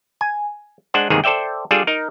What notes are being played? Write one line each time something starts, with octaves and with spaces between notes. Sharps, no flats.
G#5
G#3 D4 C5 F#5
G1 D#2 G#2 C3 D#3 G#4
A4 C5 D5 E5 G5
G3 D4 F4 G#4 A4 D5
D#4 A#4